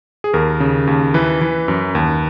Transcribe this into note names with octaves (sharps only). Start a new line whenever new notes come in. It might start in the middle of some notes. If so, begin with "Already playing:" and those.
G#4
D#2 A#4
C#3
D#2
E3 B4
E3
F#2
D#2